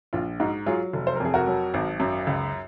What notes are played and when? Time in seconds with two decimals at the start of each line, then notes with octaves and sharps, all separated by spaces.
0.13 A#1 F4
0.40 G#2 D#4 F#4
0.66 F#3 F4 G#4
0.93 F1
1.07 C5
1.15 A#4
1.20 F2 G#4
1.34 F#4 A#4
1.47 F#3
1.74 G#1
2.00 F#2
2.27 C#2